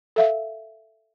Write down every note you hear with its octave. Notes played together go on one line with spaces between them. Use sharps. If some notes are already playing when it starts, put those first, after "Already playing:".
A4 E5 F5